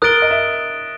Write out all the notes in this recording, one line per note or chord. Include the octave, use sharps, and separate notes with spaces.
A#4 D#6 F#6 A6 D7 G7
D#5
E5